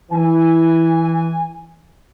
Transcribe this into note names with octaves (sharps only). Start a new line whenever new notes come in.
E3 G#5